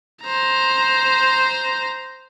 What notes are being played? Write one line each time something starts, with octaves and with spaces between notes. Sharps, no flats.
C5 A#5